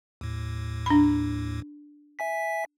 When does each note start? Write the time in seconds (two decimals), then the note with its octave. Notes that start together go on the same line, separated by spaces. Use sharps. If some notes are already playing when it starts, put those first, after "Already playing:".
0.21 D#2 A2
0.86 D4 B5
2.19 E5 G#5 B6